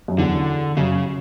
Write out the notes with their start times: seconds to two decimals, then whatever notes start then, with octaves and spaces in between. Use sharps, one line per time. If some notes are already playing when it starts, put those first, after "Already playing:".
0.08 F#2
0.18 E2 D3
0.77 F#2 C#3